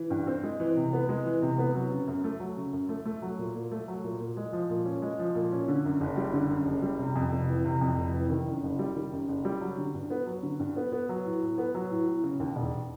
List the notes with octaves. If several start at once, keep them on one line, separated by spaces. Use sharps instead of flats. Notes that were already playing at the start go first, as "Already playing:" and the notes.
Already playing: E3
G2
C4
G#3
E3
C3
B3
G#3
E3
C3
B3
F#3
C#3
F#2
A3
F#3
C#3
F#2
A3
A3
F#3
A#2
A#2
A3
F#3
A#2
A#2
G#3
F3
A#2
C#4
G#3
F3
A#2
C#4
D3
F#2
F#1
G3
D3
F#2
F#1
G3
C3
F2
F1
E3
C3
F2
F1
E3
D#3
F#2
F#1
G3
D#3
F#2
F#1
G3
F#3
D3
G2
B3
F#3
D3
G2
B3
B3
F#3
A2
A2
B3
F#3
A2
A2
C#3
D#2
E1